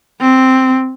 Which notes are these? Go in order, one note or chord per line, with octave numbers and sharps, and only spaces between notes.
C4